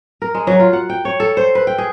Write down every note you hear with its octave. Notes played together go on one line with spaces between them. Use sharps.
A#4
G#3
F#3
F4
F#5
G5
C#5
A4
C5
B4
G5
G#4